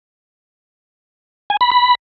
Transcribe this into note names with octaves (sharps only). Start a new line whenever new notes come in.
G#5
B5
B5